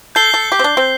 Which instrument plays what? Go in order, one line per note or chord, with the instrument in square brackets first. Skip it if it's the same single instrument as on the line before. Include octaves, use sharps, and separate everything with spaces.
[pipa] A4 [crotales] G6 C7 G7
[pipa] A4
G4
C4
D4
C4